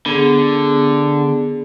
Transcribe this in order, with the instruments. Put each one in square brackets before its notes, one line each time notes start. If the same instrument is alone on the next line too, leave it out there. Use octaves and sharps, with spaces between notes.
[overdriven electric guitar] D3 [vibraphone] B3 G#4